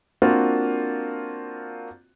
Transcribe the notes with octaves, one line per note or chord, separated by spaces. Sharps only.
A#3 C4 D4 F4 F#4